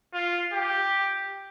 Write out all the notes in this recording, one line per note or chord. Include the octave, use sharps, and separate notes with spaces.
F4
G4